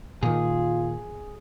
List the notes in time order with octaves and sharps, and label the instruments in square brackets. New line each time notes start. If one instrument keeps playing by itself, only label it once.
[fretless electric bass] A#2 D#3 [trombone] F4 [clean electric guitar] G#4